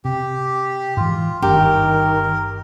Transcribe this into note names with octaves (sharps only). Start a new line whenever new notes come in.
C3 G4
G#2 E3 F4
G1 G2 D#3 D4 G4 A#4